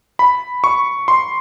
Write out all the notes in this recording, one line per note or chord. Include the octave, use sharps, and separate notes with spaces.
B5
C#6
C6